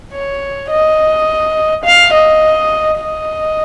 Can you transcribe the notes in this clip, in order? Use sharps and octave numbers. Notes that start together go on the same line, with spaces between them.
C#5
D#5
F5
D#5
D#5